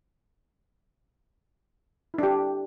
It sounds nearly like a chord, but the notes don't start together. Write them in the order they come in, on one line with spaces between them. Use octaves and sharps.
E4 D4 G4